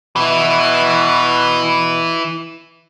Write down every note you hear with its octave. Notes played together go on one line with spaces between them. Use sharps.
B2 E3 E4